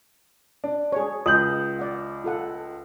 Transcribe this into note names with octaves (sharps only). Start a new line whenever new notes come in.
D4
G#4 C#5
C#2 D#6 G6 F#7
D5 F#5
F4 A4 F#5